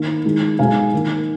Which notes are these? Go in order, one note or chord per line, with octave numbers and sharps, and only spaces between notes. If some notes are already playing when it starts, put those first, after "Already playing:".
Already playing: D#3 A#3 D#4
D#3 G#3 D#4
B2 G#3 D#4 F5 G#5
D#3 A#3 D#4